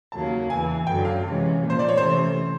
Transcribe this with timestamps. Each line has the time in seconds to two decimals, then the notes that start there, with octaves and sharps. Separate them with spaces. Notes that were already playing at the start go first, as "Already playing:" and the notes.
0.12 D#2 C#3 F#3 A#3 A5
0.49 E2 C#3 E3 G#5
0.87 F#2 D3 F#3 G5
1.05 F5
1.24 C3 E3 G#3 C#4
1.61 A#2 F3 A#3
1.70 C5
1.79 D5
1.89 C#5
1.97 C3 E3 A3 C#4 C5